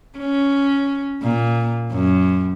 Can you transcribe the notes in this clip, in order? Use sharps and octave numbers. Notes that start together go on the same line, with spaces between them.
C#4
A#2
F#2